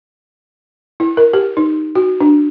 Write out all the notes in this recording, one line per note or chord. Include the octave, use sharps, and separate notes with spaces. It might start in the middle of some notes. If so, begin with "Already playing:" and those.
E4
A#4
G4
D#4
F#4
D4